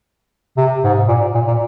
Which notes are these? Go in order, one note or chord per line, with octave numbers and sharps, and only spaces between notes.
C3
G#2
A#2
A#2
A#2